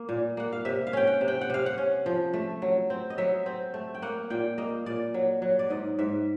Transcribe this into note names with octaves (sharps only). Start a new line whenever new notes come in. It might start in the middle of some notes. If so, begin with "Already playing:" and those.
Already playing: A#3
A#2
A#3 F#5
F5
C3 E5
F5
C#4 G5
F#5
C3
G5
F#5
C3 F5
F#5
C#4
F3
A3
F#3
C4
D#5
F#3 E5
C4
A3
G5
A#3 F#5
A#2 G5
A#3 D#5
A#2 D5
F#3
F#3
D5
G#2 D#5
G#2 E5